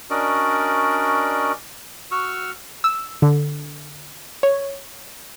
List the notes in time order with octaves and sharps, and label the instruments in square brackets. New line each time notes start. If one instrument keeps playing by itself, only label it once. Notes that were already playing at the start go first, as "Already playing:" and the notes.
[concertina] C#4 D4 F#4 A#4 D5 D#5
F#4 C#6 E6 F6
[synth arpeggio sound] E6
D3
C#5